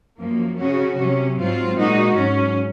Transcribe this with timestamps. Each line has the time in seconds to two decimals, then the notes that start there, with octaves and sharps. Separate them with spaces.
0.20 F#2 F3 A#3
0.58 C#3 F#3 C#4 F#4
0.98 C3 F#3 C#4
1.38 G#2 F#3 C4 F4
1.76 A#2 G#3 D#4 F#4
2.16 G#2 F#3 C#4